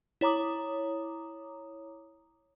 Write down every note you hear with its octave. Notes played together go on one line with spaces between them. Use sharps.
E4 C#5 A#5 D6 D#6